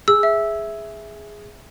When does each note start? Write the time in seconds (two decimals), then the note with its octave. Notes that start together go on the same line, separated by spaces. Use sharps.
0.08 G#4 E6
0.23 E5